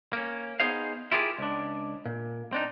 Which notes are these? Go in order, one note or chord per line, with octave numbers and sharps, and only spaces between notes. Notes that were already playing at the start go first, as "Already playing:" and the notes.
A#3 C#4
B3 D#4 G#4 C5 F5
E4 F4 G4 G#4 A#4
C#2 D4
A#2
C4 D4 D#4